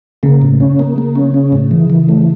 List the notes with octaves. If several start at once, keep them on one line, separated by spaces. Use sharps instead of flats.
C#3 A#3
A2
C#4
A#3
A#3
C#4
C#4
A2
E3
E3
A3